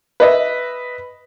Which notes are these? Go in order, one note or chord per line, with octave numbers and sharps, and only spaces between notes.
B4 D#5 E5